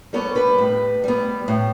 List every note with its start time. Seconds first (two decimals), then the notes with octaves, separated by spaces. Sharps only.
0.13 G3 B3 A4 C#5
0.35 G4 B4
0.58 A2
1.04 G3 B3
1.48 A2